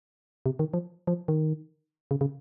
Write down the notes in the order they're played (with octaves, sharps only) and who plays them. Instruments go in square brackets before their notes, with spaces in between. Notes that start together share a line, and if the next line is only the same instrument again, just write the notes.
[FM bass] C3
D#3
F3
F3
D#3
C#3
C#3